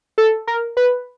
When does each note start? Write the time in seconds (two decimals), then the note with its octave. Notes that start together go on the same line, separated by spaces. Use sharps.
0.18 A4
0.47 A#4
0.77 B4